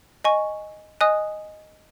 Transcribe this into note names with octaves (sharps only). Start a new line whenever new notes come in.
D#5 G#5 C#6
D#5 G#5 D#6 F#6